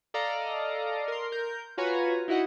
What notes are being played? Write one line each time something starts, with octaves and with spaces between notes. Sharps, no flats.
A4 D5 D#5 F5 A#5
A#4 C6
A#4 G6
F4 F#4 B4 C#5 G#5 A#5
D#4 E4 F#4 D#5 F#5